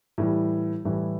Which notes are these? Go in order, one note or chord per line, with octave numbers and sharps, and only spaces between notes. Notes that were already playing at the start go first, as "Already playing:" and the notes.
A2 E3 G3
A2 E3 G3